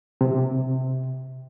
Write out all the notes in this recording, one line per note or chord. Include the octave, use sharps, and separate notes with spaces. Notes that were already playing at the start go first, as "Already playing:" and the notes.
C3